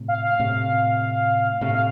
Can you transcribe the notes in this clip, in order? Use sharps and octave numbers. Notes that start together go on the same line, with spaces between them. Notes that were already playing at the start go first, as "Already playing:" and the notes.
Already playing: A2 C3
F5
F5
A2 C3
A2 C3 F5
F5